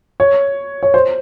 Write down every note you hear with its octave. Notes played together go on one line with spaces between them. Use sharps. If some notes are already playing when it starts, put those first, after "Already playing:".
C#5
C#5
C5